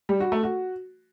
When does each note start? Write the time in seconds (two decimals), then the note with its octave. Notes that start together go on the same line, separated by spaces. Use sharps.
0.09 G3
0.20 F#4
0.32 A3
0.43 F#4